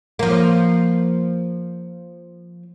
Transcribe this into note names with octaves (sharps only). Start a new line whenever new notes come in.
F3 A#3